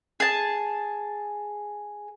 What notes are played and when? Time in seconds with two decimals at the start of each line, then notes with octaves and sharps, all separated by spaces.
0.20 G#4 A5